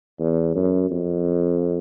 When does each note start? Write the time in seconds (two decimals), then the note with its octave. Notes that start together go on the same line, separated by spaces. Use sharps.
0.20 E2
0.55 F#2
0.91 F2